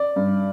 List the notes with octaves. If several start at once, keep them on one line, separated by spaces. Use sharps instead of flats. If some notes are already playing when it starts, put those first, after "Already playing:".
Already playing: D5
G2